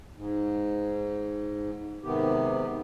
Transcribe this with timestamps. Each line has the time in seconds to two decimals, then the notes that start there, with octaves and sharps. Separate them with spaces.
0.16 G#2
2.04 G#2 C3 D#3 B3 G4